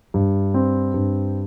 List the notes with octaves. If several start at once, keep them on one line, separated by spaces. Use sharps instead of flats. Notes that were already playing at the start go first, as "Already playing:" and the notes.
G2
C4
G2